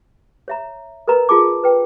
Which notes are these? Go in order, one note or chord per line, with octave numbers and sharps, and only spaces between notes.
C#5 E5 A#5
A#4 B4 D#5 A#5
F4 G#4 A5 D6
B4 G5